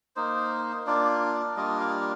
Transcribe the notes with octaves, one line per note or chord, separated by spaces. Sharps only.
A#3 D#4 C5
A#3 D4 F4 D5
D5
G3 A#3 D4 F4 D#5
F5